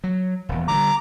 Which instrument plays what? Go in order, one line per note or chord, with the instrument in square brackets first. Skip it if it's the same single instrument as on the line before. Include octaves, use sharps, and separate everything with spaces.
[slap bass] F#3
D#1 E2
[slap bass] D3 F3 G3 [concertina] A#5 D6